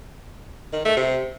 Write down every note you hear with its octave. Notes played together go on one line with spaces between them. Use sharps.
D#3
A3
C3